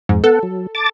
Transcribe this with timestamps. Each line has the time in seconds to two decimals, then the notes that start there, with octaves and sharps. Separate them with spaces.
0.09 F2 G#2
0.24 B3 A4 F#5
0.43 F#3
0.75 A5 D6 A6